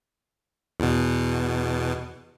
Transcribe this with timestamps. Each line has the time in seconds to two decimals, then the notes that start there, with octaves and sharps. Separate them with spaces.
0.80 E2 B2